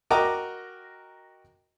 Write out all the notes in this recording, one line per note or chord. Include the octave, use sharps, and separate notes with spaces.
F#4 A#4 D#5 G5 A#5 D6